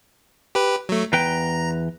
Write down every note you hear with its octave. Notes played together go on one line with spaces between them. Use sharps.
G4 B4
F#3 A3
E2 B4 G5 A#5